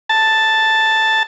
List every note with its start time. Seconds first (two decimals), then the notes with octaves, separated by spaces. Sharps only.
0.09 A5